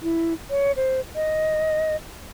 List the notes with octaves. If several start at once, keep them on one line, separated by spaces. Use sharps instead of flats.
E4
C#5
C5
D#5